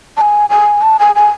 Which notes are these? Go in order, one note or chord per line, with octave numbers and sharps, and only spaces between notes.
A5
G#5
G#5
A5
G#5
G#5